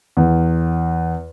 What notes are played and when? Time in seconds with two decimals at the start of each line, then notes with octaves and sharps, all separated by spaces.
0.17 E2